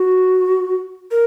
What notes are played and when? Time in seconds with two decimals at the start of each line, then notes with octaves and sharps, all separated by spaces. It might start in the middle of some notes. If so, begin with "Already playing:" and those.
Already playing: F#4
1.11 A#4